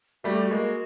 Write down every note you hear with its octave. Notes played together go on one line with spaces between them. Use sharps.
G3 A3 F#4
G4
F#4
G#3 A#3